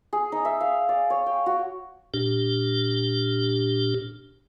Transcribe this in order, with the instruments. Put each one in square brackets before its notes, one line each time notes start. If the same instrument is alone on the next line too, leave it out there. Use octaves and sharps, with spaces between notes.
[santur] G#4
D#4
E5
F5
D5
C#5
G5
F#4
[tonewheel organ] A#2 D4 G4